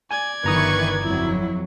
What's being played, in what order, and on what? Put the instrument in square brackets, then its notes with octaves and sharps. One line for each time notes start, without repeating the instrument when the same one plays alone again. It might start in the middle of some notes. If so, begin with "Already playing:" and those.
[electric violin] D5 G#6 [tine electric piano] G#5
[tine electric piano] G1 A#5 D#6 [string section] D#3 E3 C#6 [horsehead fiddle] B4
[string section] F2 F#3 [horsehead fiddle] E4